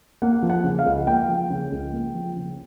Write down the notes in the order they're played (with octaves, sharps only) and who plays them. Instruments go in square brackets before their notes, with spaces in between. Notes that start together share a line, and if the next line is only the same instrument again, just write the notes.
[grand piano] A#3 F#5
F3
F#5
C#3
F5
C#2
A#3 G5
F3
C#3
C#2
A#3
F3
C#3